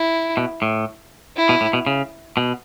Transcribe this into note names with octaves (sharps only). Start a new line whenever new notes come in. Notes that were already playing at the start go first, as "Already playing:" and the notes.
Already playing: E4
B2
A2
E4
B2
A2
B2
C#3
B2